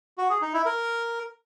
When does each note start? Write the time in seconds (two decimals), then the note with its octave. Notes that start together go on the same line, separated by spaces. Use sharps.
0.18 F#4
0.30 G#4
0.42 D#4
0.54 E4
0.66 A#4